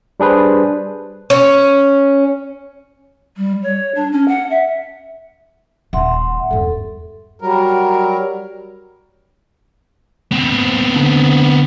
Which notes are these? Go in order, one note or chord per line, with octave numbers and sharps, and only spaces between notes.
G3 D4 G#4 B4 C5
C#4
G3
C#5
D4
C#4
F#5
E5
D#1 D#4 E5 F#5 C6
E2 G2 A4
F#3 G3 A#4
B3 C4
D3